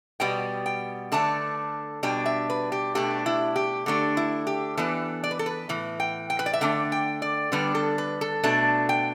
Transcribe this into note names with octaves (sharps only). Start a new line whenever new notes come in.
B2 G3 B3 G5
G5
D3 A3 D4 A5
B2 G3 D4 G5
E5
B4
G4
B2 A3 D4 G4
E4
G4
D3 A3 D4
E4
G4
E3 B3 D4 A4
D5
B4
A4
B4
A2 E3
G5
G5
B4
D5
E5
D3 A3 D4 G5
G5
D5
D3 G3 B3 D4 B4
A4
B4
A4
B2 A3 D4 A5
G5